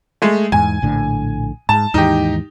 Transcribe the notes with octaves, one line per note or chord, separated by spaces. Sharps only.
G#3 A3
E2 G#2 G#5
A#1 A2 D3
G#2 A5
D#2 G#2 E3 D#4 G4